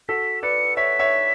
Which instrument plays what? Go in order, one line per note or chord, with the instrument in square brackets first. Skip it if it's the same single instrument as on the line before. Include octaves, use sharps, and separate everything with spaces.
[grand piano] F#4 A4 [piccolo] B6
[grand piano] B4 D5 [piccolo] C#7
[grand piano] C#5 E5 [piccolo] B6
[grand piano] C#5 E5